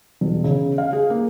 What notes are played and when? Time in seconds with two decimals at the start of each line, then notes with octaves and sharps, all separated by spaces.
0.21 E1
0.44 C#3
0.78 F5
0.93 G#4
1.10 A#3